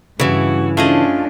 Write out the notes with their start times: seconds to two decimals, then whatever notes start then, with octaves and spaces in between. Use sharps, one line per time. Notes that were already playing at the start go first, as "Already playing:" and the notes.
0.20 G2 C#3 E3 E4 F#4
0.77 A3 C#4 D4 F4 G#4 D#5